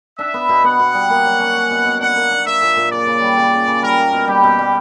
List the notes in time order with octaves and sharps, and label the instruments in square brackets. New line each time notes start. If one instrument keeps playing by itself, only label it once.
[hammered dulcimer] D4 [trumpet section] E5
[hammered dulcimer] B3
B2
[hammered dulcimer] B3 [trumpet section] F#5
[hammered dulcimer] B2
G3
A#3
F#3
C#4
C#4
B2
B2
[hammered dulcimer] D4 [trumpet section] F#5
[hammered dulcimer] A#3
D4
[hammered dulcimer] A#3 [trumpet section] E5
[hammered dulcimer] A#2
A#2
[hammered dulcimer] C#3 [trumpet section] D5
[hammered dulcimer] C#3
G3
C#3
C#3
C#3
[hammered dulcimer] G3 [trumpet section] A#4
[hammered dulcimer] A#3
B2
[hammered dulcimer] G3 [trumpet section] G4
[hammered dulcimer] B2
G3